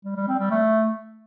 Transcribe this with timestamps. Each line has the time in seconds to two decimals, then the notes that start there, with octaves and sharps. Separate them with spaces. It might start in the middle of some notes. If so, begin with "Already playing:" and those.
0.05 G3
0.16 G3
0.28 C4
0.39 G3
0.51 A3